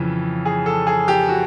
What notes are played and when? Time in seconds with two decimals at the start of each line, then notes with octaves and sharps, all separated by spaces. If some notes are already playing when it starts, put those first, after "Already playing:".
Already playing: F2 C#3 E3
0.45 G#4
0.66 A4
0.87 G#4
1.08 G4
1.29 F#4